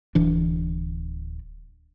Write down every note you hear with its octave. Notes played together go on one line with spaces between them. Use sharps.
D1 E3 D4